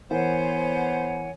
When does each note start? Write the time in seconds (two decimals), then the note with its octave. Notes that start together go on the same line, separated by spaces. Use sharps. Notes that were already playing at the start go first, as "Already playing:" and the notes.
0.11 E3 B3 A#4 C5 C#5 F#5 G#5